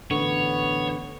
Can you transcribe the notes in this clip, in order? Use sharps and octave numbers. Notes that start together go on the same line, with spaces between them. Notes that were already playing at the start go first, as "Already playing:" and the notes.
A1 D3 B3 C#5